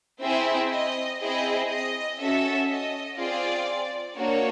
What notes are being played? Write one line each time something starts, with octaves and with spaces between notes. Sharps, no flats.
C4 E4 G#4 E5
D#5
C4 E4 G#4 D#5
D#5
C#4 F#4 A4 E5
D#5
C4 F4 G#4 D5
A#3 D4 F#4 C#5